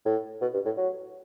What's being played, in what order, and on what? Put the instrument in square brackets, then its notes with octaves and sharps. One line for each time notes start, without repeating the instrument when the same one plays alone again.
[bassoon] A2
B2
G2
A2
F#3